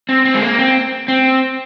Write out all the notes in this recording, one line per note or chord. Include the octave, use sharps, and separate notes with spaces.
C4
C4
G#3
A#3
C4
C4